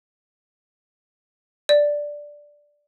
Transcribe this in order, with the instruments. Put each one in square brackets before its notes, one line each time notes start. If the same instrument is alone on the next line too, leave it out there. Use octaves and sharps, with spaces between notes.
[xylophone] D5